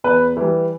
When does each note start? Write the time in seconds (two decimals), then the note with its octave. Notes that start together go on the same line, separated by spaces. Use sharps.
0.04 E2 B4
0.37 E3 G3